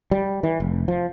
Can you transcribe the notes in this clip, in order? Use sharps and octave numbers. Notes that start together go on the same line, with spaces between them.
G3
E3
F1
F3